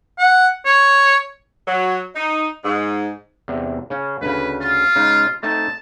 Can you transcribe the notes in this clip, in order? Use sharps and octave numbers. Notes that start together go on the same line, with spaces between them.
F#5
C#5
F#3
D#4
G#2
E2 C3
C#3 C#4
D2 C#3 B4
F4
C#3 G#3 D#4
A3 C4 D#4 A5